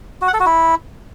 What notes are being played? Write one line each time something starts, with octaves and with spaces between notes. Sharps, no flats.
F#4
F#5
A4
F#4
E4